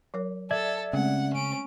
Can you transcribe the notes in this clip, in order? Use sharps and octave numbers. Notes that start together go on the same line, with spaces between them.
F#3 A#4 C#5
A4 D5 E5 G#6
C#3 G#3 A3 C4 F#5
C#4 D7